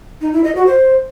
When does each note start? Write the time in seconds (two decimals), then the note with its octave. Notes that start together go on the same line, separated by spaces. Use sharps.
0.21 D#4
0.33 E4
0.44 D#5
0.55 F#4
0.67 C5